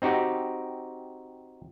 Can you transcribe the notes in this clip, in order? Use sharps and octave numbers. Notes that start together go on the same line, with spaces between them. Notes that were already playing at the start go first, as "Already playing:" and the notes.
C4 D#4 F#4 G4